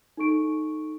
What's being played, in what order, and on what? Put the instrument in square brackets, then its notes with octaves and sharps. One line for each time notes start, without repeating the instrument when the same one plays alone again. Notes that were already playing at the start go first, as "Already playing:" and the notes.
[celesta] D#4 A4 C#6 D7